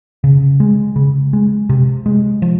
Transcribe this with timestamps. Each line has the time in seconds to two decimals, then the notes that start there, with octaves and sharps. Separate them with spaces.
0.24 C#3
0.60 G#3
0.96 C#3
1.33 G#3
1.69 C3
2.06 G#3
2.42 F3